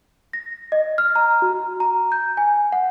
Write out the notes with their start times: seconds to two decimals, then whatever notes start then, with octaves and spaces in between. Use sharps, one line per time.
0.33 A#6
0.72 D#5
0.98 F6
1.16 A#5
1.42 F#4
1.80 A#5
2.12 G6
2.37 G#5
2.72 F#5